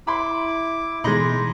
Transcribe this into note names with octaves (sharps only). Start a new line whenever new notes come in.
E4 B5 C6 D6
B2 E3 G#3 D#4 B5 C6 A#6